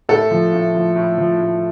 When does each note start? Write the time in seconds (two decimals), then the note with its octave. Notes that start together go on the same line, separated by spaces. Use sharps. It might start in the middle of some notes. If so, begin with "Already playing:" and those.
0.09 A2 A4
0.31 F3
0.53 A2
0.74 F3
0.96 A2
1.18 F3
1.40 A2